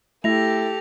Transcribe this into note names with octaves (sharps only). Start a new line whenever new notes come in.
A3 E4 G4 A4 A#6 F7